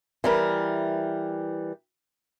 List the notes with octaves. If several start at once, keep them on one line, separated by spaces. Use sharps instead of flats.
E3 G3 A#4